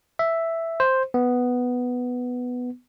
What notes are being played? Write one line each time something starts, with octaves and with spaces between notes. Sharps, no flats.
E5
C5
B3